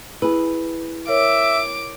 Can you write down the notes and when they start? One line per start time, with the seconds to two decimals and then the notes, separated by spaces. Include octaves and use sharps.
0.22 E4 G#4 B4
1.08 A#4 C#5 E5 D6